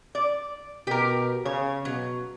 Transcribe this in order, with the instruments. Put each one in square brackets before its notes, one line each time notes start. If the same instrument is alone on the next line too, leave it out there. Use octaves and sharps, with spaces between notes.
[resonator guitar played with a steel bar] D5
[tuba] B2 [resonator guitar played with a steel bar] G4 A#4
[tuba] C#3 [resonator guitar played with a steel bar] C#5
[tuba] B2 [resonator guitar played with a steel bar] F#3